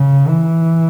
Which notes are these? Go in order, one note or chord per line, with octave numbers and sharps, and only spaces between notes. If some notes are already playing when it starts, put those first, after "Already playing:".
Already playing: C#3
E3